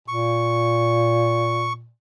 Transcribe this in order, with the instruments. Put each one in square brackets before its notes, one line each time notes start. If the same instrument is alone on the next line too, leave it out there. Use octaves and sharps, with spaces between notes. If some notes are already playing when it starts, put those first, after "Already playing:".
[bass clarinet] A#2 [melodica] C#6